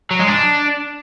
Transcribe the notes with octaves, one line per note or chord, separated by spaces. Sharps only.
F#3
G#3
D4